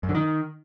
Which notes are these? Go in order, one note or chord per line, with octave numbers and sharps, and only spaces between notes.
F#2
D3
D#3